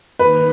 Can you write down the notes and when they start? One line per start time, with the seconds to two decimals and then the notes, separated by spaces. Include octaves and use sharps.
0.19 D#3 A#3 D#4 B4